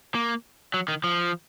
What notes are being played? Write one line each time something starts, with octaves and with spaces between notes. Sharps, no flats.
A#3
F#3
D#3
F3